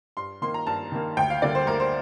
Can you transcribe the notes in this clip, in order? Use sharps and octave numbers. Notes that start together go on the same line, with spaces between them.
G2 C6
D#3 A#3 C6
A#5
G2 A5
D#3 A#3
D2 G5
F5
D3 G3 A#3 D5
C5
D2 A#4
C5